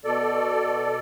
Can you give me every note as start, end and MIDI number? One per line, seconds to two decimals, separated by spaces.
0.05 0.99 47
0.05 0.99 69
0.05 0.99 74